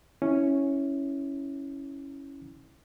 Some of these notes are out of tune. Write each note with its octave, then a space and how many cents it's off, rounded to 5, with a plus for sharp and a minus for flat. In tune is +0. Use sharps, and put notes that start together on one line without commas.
C#4 +0 E4 -15